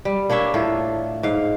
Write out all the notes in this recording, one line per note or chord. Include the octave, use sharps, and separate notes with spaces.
G3
A#3 D4 C#5 E5
A2 F4 A4
G#2 F5